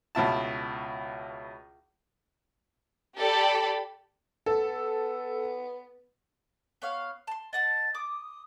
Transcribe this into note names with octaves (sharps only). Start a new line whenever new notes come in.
C#2 B2 E4 A5
G4 A4 D5 G5 B5
B3 A4
B3 C#5 F5
A5 C6
D#5 F#5 A5 A6
D6 D#6